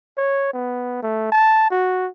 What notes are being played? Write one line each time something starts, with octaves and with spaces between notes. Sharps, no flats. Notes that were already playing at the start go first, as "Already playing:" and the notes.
C#5
B3
A3
A5
F#4